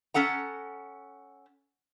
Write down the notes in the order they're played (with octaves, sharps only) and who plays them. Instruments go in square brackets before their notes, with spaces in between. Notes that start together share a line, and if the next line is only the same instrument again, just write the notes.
[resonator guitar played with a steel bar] C#4 A4 F#5 A#5